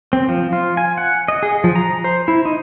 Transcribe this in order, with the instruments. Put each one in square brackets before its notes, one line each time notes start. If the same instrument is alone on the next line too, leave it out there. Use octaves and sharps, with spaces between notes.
[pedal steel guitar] C4
F3
F4
G#5
F#5
D#5
G#4
F3
A#5
C5
E4
D#4